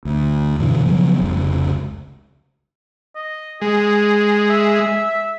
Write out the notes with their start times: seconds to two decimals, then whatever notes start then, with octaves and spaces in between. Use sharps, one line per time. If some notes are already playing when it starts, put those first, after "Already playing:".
0.05 D2
0.59 F#2 B2 D3 E3
0.85 C#3 F3 F#3 B3
1.20 F1 C#2
3.16 D#5
3.62 G#3 G#4
4.50 E5